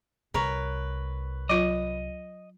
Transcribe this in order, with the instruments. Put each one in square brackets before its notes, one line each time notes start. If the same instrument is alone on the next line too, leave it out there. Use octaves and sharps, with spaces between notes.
[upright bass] C2 [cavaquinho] A#4 B4 C#5
[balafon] F#3 F4 [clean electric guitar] D#5